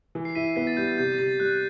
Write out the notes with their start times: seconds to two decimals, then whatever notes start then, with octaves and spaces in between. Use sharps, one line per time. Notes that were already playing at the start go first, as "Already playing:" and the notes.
0.15 E3
0.25 C7
0.35 E4 B6 D#7
0.56 B3 B6
0.67 A6
0.77 G3 G6
0.88 A6
0.98 C3 G6
1.18 C3 A6
1.40 G3 F#6